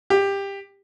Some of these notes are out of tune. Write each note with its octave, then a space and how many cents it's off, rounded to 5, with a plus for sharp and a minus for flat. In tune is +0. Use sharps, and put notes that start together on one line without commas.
G4 +15